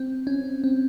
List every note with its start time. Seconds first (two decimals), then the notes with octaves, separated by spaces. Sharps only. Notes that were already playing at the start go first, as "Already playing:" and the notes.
Already playing: C4
0.27 C#4
0.64 C4